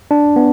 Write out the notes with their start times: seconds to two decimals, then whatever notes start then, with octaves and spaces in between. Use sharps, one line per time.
0.11 D4
0.36 B3